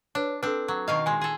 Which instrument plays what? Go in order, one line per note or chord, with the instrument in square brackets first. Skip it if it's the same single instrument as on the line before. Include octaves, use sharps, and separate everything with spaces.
[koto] D4 [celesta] B4 C#5
[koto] C4 D4 [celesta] A4 B4
[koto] F#3
[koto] B2 D#3 F5 [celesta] D#5 C#6
[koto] A#2 G#3 [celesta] G#5 C6
[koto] G#4 A4